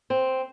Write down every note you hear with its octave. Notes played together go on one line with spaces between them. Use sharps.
C4